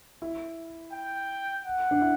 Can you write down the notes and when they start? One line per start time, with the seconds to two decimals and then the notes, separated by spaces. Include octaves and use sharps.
0.22 E4
0.93 G5
1.65 F#5
1.91 D4
2.01 E4